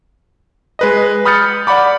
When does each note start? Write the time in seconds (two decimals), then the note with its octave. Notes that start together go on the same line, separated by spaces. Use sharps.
0.79 G#3 B4 D#5
1.25 B5 D#6 F6 G6 A6 C#7
1.67 D5 F#5 B5 D6